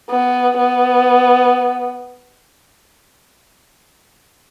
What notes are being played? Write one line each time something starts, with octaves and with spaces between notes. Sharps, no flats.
B3
B3